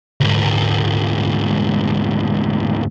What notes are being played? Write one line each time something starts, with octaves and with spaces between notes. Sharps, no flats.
D2 G#2